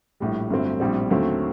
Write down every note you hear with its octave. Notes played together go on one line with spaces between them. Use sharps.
A#1 A2 G3
G1 G2 F#3 A3 C4
A#1 A2 G3 C4
D#2 D3 F#3 A3 C4